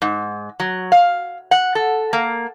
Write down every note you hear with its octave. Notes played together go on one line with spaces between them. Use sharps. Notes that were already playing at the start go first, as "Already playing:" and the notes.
G#2
F#3
F5
F#5
A4
A#3